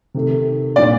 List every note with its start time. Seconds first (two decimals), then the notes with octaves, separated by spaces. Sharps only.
0.14 C3 D#3 A3
0.75 A#2 G3 D4 D5